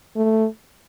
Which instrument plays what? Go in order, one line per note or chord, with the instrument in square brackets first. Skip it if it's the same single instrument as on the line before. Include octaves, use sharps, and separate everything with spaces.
[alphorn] A3